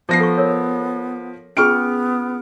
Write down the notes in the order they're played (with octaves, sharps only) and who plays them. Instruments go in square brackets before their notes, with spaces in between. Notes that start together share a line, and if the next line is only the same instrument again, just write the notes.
[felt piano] F3 A#6 C7 [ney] B3
[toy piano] A4 C#6
A#4 C#5
[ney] B3 [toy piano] C#4 F4 G#4 [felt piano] C#6 F6 D7